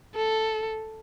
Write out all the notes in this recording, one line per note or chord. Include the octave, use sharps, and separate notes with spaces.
A4